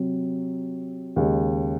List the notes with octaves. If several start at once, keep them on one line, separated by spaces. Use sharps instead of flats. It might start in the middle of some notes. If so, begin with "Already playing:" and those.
Already playing: C3 F#3 C4
D#2 C#3 G#3